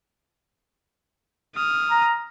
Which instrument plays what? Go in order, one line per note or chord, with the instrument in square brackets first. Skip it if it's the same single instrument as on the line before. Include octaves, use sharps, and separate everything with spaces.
[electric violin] D#6 F6
[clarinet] A#5